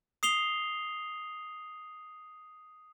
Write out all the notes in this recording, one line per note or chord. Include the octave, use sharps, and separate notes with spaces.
D#6 C7 F7 G7